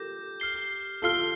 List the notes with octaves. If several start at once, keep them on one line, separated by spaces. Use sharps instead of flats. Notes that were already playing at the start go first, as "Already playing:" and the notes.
Already playing: F4 G4 A4 A#4 D6 G6 A#6
F6 C7 G7
F4 A4 F6 C7 G7